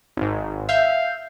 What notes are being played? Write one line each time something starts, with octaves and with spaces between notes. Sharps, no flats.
G#1 G#2
E5 F5 G6